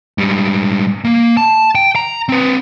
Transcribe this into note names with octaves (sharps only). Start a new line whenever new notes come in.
G#2 G3
A#3
A5
G5
A#5
C4 B4